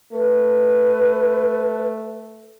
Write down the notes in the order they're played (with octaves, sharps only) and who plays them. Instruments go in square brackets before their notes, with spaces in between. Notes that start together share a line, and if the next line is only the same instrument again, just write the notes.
[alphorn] A3 [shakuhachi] B4